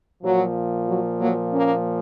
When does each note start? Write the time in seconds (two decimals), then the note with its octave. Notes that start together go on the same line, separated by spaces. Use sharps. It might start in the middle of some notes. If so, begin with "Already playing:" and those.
0.23 A#2 F3 F#3
0.88 F#3
1.19 F#3 A#3
1.53 A#3 C#4